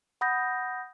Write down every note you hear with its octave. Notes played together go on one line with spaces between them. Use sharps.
F#5 B5 D#6 G6 A#6